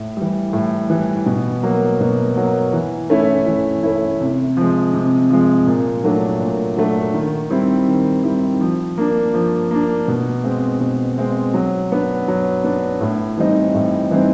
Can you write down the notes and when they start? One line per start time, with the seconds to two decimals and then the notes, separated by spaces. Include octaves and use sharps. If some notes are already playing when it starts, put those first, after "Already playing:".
Already playing: A2
0.17 E3 G3
0.53 A2
0.90 E3 G3
1.26 B2
1.63 F#3 A#3
2.00 B2
2.37 F#3 A#3
2.73 E3
3.10 A3 C#4 E4
3.47 E3
3.83 A3 C#4 E4
4.20 C3
4.57 F3 G#3
4.93 C3
5.30 F3 G#3
5.67 A#2
6.04 F#3 A3 D4
6.40 A#2
6.77 F#3 A3 D4
7.14 D#3
7.50 G3 C4 E4
7.87 D#3
8.24 G3 C4 E4
8.61 F3
8.98 A#3 D4
9.34 F3
9.71 A#3 D4
10.08 B2
10.44 G#3 C4
10.80 B2
11.18 G#3 C4
11.54 F#3
11.91 B3 D4
12.28 F#3
12.64 B3 D4
13.01 A2
13.37 E3 G3 C4 D#4
13.74 A2
14.11 E3 G3 C4 D#4